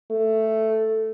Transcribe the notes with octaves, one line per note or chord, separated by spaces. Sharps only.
A3